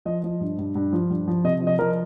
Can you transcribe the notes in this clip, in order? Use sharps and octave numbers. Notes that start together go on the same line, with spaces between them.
F3 D#5
F3
G2
G2
G2
F3
G2
F3
C3 D#5
F3
D#5
F3 A#4